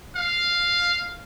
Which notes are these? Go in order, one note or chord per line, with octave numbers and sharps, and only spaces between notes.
F5